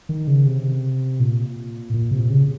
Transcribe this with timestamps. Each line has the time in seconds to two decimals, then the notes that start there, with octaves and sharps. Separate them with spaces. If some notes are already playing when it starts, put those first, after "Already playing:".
0.09 D#3
0.27 C#3
0.46 C3
1.20 A#2
1.94 A#2
2.11 C3
2.30 C#3